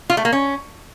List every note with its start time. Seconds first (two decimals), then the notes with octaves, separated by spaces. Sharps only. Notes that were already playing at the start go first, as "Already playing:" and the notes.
0.10 F4
0.17 A3
0.25 A#3
0.33 C#4